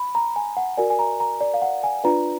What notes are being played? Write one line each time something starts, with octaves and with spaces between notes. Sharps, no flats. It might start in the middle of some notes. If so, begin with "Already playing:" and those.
Already playing: B5
A#5
G#5
F#5
F#4 A#4 D5 G#5
G#5
A#5
A#5
D5
F5
F#5
G#5
D4 F4 B4 D5 A#5